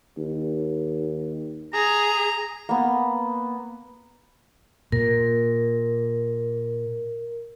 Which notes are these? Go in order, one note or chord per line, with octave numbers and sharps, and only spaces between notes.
D#2
G#4 A#5
A#3 B3
A#2 A#4